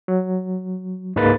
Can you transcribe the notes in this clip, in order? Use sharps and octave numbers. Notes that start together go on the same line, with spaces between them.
F#3
C#2 G#2 G#3 A#3 B4 A6